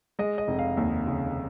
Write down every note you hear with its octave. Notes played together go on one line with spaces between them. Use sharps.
G#3 D#5
D#5
F1
F5
D#2
C#3